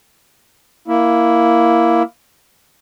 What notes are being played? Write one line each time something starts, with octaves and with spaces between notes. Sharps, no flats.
A#3 E4